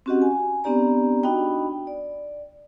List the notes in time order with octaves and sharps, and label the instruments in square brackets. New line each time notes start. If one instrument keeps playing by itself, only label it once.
[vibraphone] C4 C#4 F#4 G4 D#5 F#5
G#5
B3 C4 D4 G4 D5 A#5
D4 D#4 F#4 D#5 G5 B5
D5